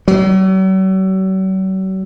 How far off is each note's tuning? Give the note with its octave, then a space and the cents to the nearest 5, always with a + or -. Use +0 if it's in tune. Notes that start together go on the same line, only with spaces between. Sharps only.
F#3 +45